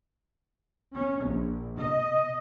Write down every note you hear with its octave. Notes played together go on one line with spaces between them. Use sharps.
C#4
A#1
D#5